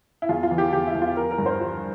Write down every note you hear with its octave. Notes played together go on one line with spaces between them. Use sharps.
E4
E2 F4
F4
E3
G4
E2 G4
E4
E2
F4
F3 A#4
A#4
G2
C5
F3